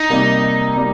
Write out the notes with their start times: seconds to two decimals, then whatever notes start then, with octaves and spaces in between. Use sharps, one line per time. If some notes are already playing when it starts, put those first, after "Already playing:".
Already playing: D#4
0.09 C3 G3 A#3
0.74 C3 G3 A#3